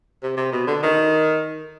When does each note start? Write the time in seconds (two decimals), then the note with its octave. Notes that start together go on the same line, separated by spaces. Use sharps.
0.23 C3
0.37 C3
0.52 B2
0.67 D3
0.82 D#3